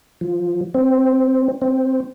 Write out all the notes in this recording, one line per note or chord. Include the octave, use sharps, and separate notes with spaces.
F3
C4
C4